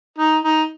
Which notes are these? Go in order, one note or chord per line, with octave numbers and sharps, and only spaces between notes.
D#4
D#4